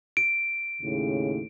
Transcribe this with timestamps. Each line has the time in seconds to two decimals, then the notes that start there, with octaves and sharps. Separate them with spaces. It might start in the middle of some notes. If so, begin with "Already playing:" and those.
0.17 D7
0.81 D#2 A2 C#3